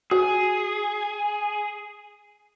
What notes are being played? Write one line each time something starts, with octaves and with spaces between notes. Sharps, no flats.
F#4 G#4